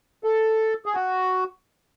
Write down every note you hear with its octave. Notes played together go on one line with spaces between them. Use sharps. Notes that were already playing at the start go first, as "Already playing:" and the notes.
A4
G#4
F#4